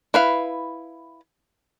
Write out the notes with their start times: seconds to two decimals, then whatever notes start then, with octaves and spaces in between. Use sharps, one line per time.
0.14 E4 B4 F5